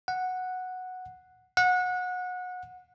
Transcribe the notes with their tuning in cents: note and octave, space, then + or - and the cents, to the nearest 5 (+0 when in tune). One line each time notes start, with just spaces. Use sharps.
F#5 -5
F#5 -25